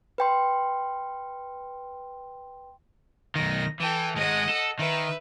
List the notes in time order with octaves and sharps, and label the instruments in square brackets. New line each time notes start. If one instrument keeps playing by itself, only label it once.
[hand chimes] B4 G5 C6
[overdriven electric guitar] B1 D#3 [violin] A#6
[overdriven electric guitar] E3 [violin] A4 G5
[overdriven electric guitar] D#3 G#3 [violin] D#5 F#5
[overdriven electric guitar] A4
[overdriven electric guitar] D#3 [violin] B4 E5